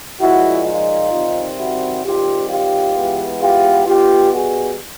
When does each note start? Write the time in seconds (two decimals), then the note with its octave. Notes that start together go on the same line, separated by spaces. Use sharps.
0.20 A#2 F3 G#3 E4 F#4
0.65 D#4 F4
1.12 C3 D#3 G3 C4
1.58 E4 F#4
2.03 D#3 G3 C4 F4 G4
2.49 F4 G4
2.94 E3 G#3 B3
3.41 F4 G4
3.86 B2 G3 B3 F4 G4
4.32 F#4 G#4